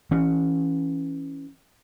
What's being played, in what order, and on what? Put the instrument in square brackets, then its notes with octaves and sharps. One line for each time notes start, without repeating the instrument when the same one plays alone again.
[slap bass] E3 C#4